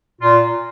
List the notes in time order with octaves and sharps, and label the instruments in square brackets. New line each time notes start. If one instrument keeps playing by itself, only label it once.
[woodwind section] A#2 F4